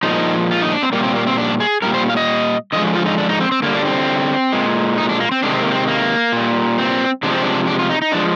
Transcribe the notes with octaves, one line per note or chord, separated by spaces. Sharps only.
A#2 F3 G#3 D#4
F4
D#4
D4
C4
A#2 G3 A#3
C4
A#3
C4
D4
G#4
A#2 G3 A#4
C5
F5
D#5
D3 F3 G#3 D#5
F4
D#4
D4
D#4
C4
C4
D3 G3 A#3
D4
C4
A#2 G#3
D#4
D4
A#3
C4
C3 D#3 G#3 D4
C4
A#3
C4
A#3
A#2 G3
C4
C3 F3 G#3 D4
C4
D4
D4
F4
D#4
D#4
D3 F3 G#3 D4